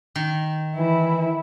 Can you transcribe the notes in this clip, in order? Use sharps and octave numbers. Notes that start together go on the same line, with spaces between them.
D#3
E3 E4